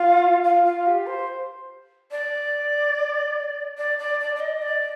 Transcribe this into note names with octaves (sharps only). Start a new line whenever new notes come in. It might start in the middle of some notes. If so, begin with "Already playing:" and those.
Already playing: F4
F4
F4
G4
C5
D5
D5
D5
D5
D5
D#5
D5